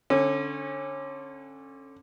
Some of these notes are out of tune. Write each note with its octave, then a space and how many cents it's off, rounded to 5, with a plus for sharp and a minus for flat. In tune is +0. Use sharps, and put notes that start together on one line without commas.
D3 +0 C#4 -25